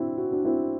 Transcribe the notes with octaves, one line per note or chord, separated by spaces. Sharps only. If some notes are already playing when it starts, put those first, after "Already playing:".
Already playing: C4 D4 E4 F#4
F#4
D4 F#4
C4 E4